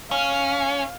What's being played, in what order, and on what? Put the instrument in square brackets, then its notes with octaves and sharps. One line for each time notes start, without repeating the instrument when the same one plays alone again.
[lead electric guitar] C#4 [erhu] F5